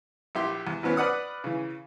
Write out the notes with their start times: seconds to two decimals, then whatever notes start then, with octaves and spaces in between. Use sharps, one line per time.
0.35 A#1 E4 G4 C6
0.67 E2
0.83 G#1 E3 B3 C#4
0.96 B4 D5 F#5 D#6 F6
1.44 C#3 E3